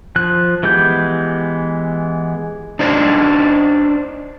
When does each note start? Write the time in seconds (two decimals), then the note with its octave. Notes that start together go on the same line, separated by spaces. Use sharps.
0.16 F3 F#6
0.63 E3 G#3 B3 G4 G6
2.79 D4 D#4 C5 D5 D#5